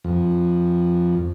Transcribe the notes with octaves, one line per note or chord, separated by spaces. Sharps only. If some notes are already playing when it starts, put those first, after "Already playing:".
F2